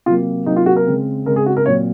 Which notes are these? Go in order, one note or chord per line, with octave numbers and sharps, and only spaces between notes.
C3 F#3 A#3 F4
C3 F#3 A#3 D#4
F4
F#4
A#4
C#3 G#3 C4
C#3 G#3 C4 A#4
G#4
F#4
A#4
A#2 F#3 C4 C#5